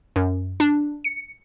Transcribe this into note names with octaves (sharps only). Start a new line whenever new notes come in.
F#2
D4
C#7